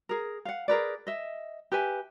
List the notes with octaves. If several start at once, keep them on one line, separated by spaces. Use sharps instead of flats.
G#4 A#4
F5 F#5
G#4 A#4 B4 D5
D#5 E5
G4 B4 E5 G#5